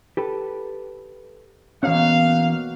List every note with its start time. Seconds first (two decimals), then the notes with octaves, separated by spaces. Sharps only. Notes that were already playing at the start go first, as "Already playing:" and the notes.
0.17 G4 A4 B4
1.83 B2 E3 A#3 C#4 F5